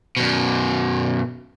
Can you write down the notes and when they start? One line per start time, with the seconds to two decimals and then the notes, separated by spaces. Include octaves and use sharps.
0.17 F#2 B2